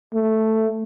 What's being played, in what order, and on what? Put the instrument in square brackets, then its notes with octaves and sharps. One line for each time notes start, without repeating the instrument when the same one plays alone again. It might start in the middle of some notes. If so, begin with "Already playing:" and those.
[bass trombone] A3